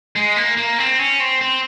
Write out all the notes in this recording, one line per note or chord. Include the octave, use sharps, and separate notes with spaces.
G#3
A#3
A#3
C4
C#4
C4
C4